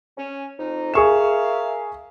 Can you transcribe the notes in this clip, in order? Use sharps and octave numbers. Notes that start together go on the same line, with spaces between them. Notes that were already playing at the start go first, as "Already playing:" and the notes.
C#4
F2 D#4
G#4 A#4 E5 F5 C#6 E7